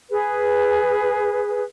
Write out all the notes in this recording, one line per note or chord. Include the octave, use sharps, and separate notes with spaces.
G#4 B4